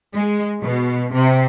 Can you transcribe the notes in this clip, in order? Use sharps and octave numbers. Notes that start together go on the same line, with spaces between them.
G#3
B2
C3